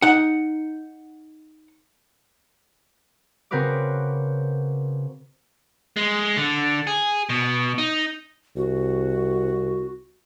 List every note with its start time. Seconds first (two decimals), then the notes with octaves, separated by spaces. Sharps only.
0.02 D#4 F#5
3.51 C#3 C4 F#4 A#4 B4 D6
5.97 G#3
6.37 D3
6.87 G#4
7.29 B2
7.78 D#4
8.56 C2 F#4